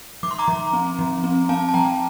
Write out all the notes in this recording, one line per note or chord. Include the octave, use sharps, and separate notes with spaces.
F3 D6
C6
A#5 D6
F3
C4
F3
C4
C4 F5 A5
A5
F3 G5 A#5